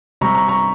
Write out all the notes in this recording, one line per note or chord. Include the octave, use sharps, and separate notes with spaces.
C3 G3 A#5 C#6
A#5 C#6
A#5 C#6